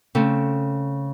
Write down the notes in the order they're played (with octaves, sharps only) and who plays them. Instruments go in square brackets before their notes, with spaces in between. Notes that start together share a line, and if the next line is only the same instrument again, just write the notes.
[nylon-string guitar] C#3 A3 C4